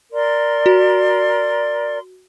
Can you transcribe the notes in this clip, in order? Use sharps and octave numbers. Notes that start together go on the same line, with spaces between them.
A#4 D5 C6
F#4